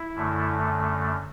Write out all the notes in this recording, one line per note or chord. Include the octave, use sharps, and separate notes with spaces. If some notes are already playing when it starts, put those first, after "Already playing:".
Already playing: E4
F#2 D3 A3